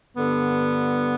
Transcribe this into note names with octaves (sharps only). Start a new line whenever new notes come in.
G2 D3 B3